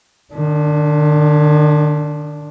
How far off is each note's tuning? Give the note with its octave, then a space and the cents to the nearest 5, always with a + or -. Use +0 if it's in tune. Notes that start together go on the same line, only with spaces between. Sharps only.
D#3 -45 D4 -10